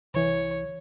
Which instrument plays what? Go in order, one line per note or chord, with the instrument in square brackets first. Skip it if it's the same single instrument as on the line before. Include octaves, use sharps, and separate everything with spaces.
[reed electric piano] C2 E3 [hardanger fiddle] C#5